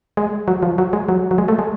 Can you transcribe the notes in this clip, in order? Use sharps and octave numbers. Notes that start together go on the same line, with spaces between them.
G#3
F#3
F3
F#3
G#3
F#3
F#3
G#3
A3
G#3